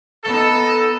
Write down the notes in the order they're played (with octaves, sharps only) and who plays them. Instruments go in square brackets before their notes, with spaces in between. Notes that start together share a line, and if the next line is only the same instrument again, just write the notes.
[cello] B3 D#4 [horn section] A4